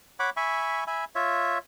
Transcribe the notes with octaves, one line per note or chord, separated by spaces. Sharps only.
C#5 F#5 B5 D6
E5 G#5 B5 C#6
E5 G#5 B5
F4 C#5 E5